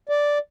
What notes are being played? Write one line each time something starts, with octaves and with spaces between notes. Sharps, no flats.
D5